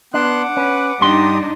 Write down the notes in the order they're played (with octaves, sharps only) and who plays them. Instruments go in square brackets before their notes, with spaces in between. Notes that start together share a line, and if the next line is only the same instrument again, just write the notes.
[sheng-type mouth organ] B3 C6 F#6 [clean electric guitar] D4 [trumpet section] F#5 D6
[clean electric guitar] C#4 [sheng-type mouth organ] B4
[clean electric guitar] G2 C6 [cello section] D4 D#4 [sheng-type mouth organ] G4 D#6